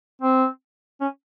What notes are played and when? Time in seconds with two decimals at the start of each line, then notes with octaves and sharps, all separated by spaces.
0.22 C4
1.01 C#4